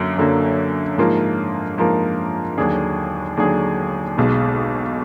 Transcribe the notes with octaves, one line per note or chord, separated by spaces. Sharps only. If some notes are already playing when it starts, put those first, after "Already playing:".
Already playing: F#2 D3 F#3 A#3
F#2 D3 F#3 A#3
G#2 F3 A#3 F4 A#4
G#2 F3 A#3 F4 A#4
D#2 D3 F#3 D4 G#4
D#2 D3 F#3 D4 G#4
B1 B2 G#3